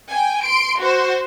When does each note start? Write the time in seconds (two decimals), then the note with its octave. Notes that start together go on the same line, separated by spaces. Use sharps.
0.11 G5 G#5
0.46 C6 D7
0.80 F#4 C5